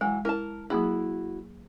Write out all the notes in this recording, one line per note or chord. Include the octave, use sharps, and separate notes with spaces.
E3 F#3 G#3
E4 A#4 A5
F#3 A#3 E4 F#4 G#4